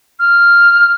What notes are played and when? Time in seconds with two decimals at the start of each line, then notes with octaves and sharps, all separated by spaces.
0.19 F6